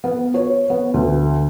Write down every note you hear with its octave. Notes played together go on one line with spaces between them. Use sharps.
B3
C#5
B3
D2